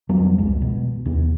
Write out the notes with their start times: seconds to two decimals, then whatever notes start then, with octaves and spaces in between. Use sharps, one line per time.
0.09 F2 F#3 G3 B3
0.38 G#1 C#2 G#3
0.62 B2
1.06 D#2 B3